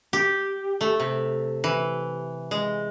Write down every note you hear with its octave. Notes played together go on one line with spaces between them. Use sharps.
G4
A3
C3
E3
G#3